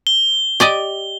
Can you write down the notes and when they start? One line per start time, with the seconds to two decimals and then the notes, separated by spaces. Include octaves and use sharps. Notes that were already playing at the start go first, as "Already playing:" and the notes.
0.07 G7
0.60 G4 D5 D#5